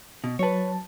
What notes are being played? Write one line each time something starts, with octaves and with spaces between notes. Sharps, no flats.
B2
F#3 B4 C#5 A5